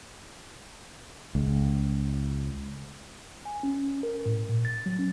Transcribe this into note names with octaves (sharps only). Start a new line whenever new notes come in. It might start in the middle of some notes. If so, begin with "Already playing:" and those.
C#2
G#5
C#4
A#4
A2
A#2
A6
F#3
C#4